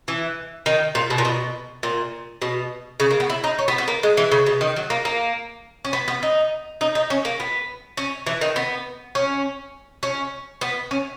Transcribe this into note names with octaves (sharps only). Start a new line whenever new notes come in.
E3
D#3
A#2
B2
A#2
B2
A#2
B2
C#3
A#3
B3
E4
D#4
C#4
B3
B3
A#3
G#3
E3
C#3
B2
D#3
F#3
A#3
A#3
C#4
B3
B3
D#4
D#4
D#4
C#4
A#3
B3
C#4
E3
D#3
B3
C#4
C#4
B3
C#4